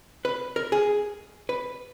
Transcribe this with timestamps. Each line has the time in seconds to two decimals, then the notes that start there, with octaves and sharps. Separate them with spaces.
0.25 B4
0.56 A#4
0.72 G#4
1.49 B4